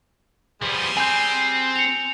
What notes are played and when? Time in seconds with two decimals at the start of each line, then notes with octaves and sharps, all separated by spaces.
0.62 F3 G3 B3 G#4 C6
0.97 C4 G#5 G6
1.76 C#7 F7